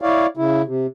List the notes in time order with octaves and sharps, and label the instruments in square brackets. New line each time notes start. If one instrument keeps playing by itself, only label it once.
[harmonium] E4 C#5 D5 F5
C#3 E4
C3